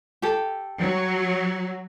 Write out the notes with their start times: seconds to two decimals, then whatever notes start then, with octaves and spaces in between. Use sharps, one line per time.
0.22 G4 A4
0.79 F#3